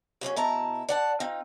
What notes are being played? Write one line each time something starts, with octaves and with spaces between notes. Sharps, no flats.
F#3 A#3 C4 C#4
B2 E4 A5 A#5
D5 F#5 A5
C4 D#4 F4